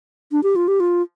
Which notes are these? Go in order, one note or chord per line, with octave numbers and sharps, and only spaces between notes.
D4
G4
F4
G4
F4